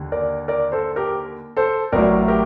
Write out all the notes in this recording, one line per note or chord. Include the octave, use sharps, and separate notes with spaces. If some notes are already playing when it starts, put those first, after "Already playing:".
Already playing: D#2 D3
A#4 D5
A#4 D5
A4 C5
G4 A#4
A4 C5
A1 A2 F#3 A#4 D5
G4 A#4